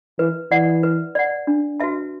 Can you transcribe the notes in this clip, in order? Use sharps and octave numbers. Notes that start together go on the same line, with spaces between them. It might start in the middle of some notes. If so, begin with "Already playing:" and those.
E3 B4
E3 D5 F#5
B4
D5 F#5
D4
F#4 B4 E5 A5